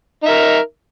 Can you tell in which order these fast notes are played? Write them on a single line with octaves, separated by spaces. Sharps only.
D#4 E5 A#4